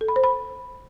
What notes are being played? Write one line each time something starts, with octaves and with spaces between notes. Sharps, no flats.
A4
B5
C5
B5